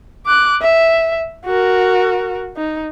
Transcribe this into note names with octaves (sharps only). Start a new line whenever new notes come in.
D6 F#6
E5
F#4 A#4
D#4